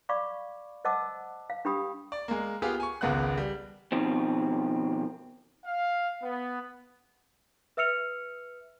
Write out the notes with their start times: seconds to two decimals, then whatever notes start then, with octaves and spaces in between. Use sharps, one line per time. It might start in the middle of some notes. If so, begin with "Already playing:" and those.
0.09 D5 F5 B5 C#6 D6
0.85 C5 D#5 F#5 A5 D6 E6
1.50 F5
1.65 D4 G4 G5 B5 D#6
2.12 D5
2.28 G#3 A#3
2.62 B3 F4 G4 G#4
2.80 G#5 C#6
3.01 G#1 C#2 G#3 B3 F#5 F#6
3.38 G3
3.92 B2 D#3 F3 C4
5.66 F5
6.22 B3
7.77 B4 E5 E6 F6 C#7 F7